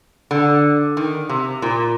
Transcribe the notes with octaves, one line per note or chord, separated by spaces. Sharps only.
D3
D#3
C3
A#2